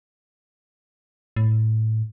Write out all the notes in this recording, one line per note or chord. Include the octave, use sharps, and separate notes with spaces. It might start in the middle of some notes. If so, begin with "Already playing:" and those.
A2